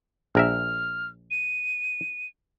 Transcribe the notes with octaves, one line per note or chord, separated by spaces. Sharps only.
A#1 A#4 E5 F6
D#7